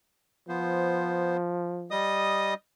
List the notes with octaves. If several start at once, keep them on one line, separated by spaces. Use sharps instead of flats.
F3 B3 C5
G3 D#5 D#6